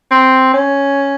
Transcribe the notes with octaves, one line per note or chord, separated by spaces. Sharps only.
C4
C#4